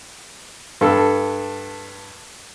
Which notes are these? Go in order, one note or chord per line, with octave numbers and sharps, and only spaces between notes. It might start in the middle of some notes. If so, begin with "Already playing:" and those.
G2 A4